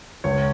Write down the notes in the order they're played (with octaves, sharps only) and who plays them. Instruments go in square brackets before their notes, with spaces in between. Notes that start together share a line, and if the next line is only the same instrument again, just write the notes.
[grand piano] C#2 C#5